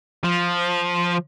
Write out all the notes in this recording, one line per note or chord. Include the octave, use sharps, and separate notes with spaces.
F3